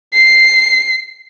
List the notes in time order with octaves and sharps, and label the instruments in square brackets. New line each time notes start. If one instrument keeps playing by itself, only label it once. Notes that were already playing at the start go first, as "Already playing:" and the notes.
[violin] C7